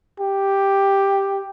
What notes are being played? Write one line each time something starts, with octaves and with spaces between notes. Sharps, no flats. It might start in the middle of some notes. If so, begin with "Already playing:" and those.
G4